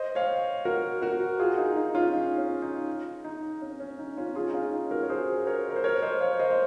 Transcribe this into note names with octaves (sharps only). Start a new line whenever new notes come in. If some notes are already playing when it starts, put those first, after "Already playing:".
Already playing: C5 D#5
C#5 F5
F#4 A#4
F#4 A#4
F4 G#4
D#4
D#4
C#4 F4
D#4
C#4
D#4
D#4
C#4
C#4
D#4
C#4 F4
F4 G#4
D#4
C#4 F4
D#4
F#4 A#4
C#5
G#4 C5
A#4 C#5
A#4
C5
A#4 C#5
C5 D#5
C#5 F5
C5 D#5
C5